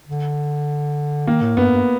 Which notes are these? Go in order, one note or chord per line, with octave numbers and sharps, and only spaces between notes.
D3
D#3 A#3
A2
G2 B3
G2